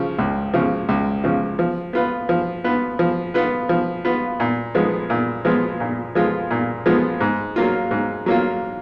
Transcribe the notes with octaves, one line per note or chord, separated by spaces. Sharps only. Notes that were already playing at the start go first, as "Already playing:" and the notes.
Already playing: C#3 F3
C#2
C#3 F3
C#2
C#3 F3
F3
B3 F4 B4
F3
B3 F4 B4
F3
B3 F4 B4
F3
B3 F4 B4
A#2
F3 G#3 B3 F4
A#2
F3 G#3 B3 F4
A#2
F3 G#3 B3 F4
A#2
F3 G#3 B3 F4
G#2
F#3 A#3 F4
G#2
F#3 A#3 F4